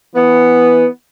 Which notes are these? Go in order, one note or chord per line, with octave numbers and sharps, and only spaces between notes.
E3 B3